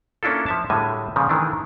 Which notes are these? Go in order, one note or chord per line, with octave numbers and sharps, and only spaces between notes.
A#3 C#4 D4 E4 F4 A4
F3 E5 A5
A2 D3 G3 G#3 G#5
A#2 C#3 F3
D#3 E3 A3 D4